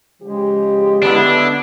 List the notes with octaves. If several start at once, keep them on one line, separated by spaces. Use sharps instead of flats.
C#3 F3 G#3 G4
D3 B3 D4 E4